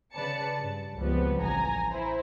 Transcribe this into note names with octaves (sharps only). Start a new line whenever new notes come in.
C#3 B4 D5 A5 C#7
G2
C#2 F3 G3 B3 C4
A1 G#5 A#5
E4 C5